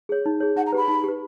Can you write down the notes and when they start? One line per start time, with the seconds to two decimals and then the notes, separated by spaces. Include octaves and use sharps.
0.09 G#4 C#5
0.26 D#4
0.40 G#4 C#5
0.56 D#4 F#5
0.66 A#5
0.72 G4 B4 B5
0.88 D#4
1.04 G4 B4